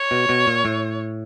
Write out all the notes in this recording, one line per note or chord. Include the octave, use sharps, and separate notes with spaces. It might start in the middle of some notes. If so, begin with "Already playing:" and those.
Already playing: C#5
B2
B2
A#2
A2